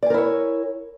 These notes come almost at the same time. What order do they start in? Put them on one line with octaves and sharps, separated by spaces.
D5 G#5 A#4 E4 C#5